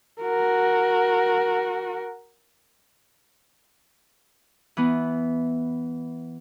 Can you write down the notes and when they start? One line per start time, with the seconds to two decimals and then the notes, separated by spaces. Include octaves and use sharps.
0.22 F#4 A#4
4.77 E3 B3